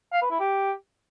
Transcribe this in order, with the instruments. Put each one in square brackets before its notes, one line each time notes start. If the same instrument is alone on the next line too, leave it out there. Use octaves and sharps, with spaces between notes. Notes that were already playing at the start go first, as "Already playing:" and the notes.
[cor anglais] F5
B4
E4
G4